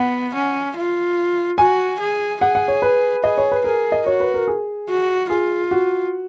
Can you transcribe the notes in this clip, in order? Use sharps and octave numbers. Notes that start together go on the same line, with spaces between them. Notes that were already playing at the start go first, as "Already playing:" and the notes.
Already playing: B3 F#5
C#4
F4
F#4 G#5
G#4
G#4 F#5
F#5
C#5
B4
G#4 D#5
C#5
B4
G#4 A#4
D#5
F#4 C#5
B4
A#4
G#4
F#4
F4 G#4
F#4